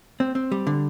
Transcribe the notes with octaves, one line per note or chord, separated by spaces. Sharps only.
C4
C4
G3
D3